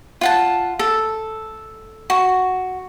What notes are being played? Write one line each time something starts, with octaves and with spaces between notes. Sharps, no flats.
F4 F#5 A5
A4
F#4